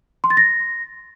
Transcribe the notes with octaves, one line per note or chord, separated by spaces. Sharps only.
C6
A6
A#6